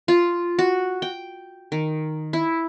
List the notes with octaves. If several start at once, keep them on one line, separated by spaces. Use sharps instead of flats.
F4
F#4
G5
D#3
E4